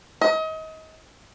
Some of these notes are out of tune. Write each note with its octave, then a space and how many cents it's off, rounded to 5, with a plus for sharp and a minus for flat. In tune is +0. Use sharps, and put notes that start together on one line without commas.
D#5 +30